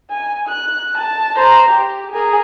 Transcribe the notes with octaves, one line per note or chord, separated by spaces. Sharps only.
G#5
F#6
A5
C5 A#5
G4
G#4 A#4